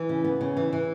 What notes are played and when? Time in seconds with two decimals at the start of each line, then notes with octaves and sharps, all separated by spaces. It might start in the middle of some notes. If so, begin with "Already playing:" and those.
Already playing: E3
0.09 C#3
0.24 B3
0.41 C#3
0.57 E3
0.73 E3